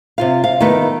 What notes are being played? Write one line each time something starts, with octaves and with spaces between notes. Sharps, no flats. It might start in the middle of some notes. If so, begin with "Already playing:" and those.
C3 F4 F5
F5
D#3 A3 B3